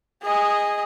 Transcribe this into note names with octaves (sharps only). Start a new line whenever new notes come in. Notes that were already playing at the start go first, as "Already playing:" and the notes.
G#4 D#5